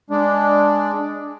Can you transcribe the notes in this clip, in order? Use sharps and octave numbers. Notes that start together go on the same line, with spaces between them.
G#3 D4